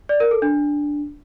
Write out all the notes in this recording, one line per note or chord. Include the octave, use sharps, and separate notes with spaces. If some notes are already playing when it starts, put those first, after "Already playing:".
D5
A#4
A4
D4